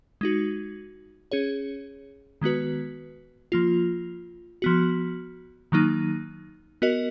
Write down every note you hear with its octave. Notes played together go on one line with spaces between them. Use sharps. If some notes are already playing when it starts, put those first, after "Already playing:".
G#3 D#4 F#4
C#4 G#4 C#5
D#3 G#3 B3 F#4 B4
F3 A#3 F4
F3 B3 F#4
D#3 F#3 A#3 D#4
B3 F#4 A#4 D#5